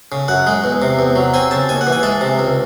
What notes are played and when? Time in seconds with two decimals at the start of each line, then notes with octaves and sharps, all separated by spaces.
0.12 C#3
0.28 F#2 F#5
0.47 G#3
0.64 E2
0.82 C3
0.99 E2
1.16 F#3
1.34 C4 G#5
1.51 C#3 A5
1.69 D#2 G#5
1.81 F#5
1.87 E3
1.92 G#5
2.03 G#3 A5
2.21 C3
2.39 C#2